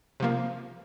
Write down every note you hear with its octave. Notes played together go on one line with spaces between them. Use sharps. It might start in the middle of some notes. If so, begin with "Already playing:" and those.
C3 F3 A#3